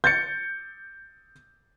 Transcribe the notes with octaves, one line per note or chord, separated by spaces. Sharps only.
G6 A6 C#7